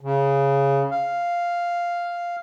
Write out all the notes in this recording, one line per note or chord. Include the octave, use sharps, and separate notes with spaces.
C#3
F5